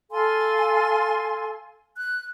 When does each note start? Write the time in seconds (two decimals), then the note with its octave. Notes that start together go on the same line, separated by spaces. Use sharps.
0.11 A4 F5 G#5 C6
1.97 F#6